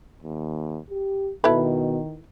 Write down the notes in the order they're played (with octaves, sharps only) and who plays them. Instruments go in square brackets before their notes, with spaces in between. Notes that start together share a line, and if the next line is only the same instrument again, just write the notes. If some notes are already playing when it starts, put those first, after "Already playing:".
[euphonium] D#2
G4
[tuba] B2 [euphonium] D#3 [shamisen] E4 A4 B4